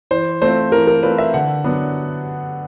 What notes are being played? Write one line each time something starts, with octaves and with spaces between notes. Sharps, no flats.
E3 C5
A3 C4 F4 C5
E3 A#4
A#4
A3 C4 F4 B4
E5
D3 F#5
F#3 B3 D4